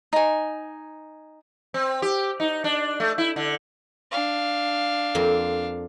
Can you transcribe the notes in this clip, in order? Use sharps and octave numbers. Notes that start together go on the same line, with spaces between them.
D#4 G#5
C4
G4
D#4
D4
A3
E4
D3
D4 F5
F2 A#3 C4